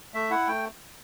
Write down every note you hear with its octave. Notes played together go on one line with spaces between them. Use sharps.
A3 E5
E4 F#5
A3 G5